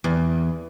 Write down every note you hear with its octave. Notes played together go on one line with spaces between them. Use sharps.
E2